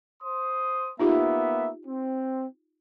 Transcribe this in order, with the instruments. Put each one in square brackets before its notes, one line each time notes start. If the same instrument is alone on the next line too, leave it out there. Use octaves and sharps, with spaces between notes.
[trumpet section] C5 C6 D#6
[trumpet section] A#3 B3 E5 [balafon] D#4 F4 G4
[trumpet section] C4